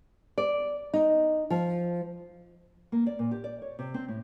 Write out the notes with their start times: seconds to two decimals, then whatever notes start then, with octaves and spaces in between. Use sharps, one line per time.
0.38 D5
0.94 D#4
1.50 F3
2.92 A#3
3.06 D5
3.19 A#2
3.31 G4
3.44 D5
3.62 C#5
3.79 C3
3.94 C4
4.08 A2